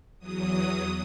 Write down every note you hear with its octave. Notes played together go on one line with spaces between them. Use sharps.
E2 F#3 D#6